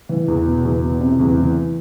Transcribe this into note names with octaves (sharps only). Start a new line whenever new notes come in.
E3
E2
B2
E2
B2
C3
E2
E3